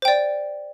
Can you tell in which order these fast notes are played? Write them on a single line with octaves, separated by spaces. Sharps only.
C5 G5 D5